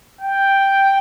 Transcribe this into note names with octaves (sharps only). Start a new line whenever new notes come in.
G5